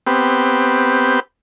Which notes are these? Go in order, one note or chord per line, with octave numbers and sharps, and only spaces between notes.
B3 C4 G4